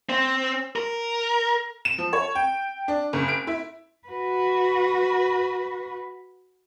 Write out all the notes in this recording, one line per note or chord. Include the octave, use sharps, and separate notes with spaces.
C4
A#4
E7
F3
C#5
G5
D4
F#1
D7
E4
F#4 B4